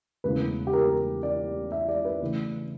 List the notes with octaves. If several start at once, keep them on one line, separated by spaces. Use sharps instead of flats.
E1 D2 C#3 E3 B4
G4
A#4
D5
E5
D5
B4
D2 C#3 E3